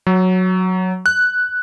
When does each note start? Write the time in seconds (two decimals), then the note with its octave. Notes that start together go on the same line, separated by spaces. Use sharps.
0.07 F#3
1.06 F#6